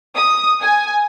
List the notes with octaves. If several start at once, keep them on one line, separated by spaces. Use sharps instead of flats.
D#6
G#5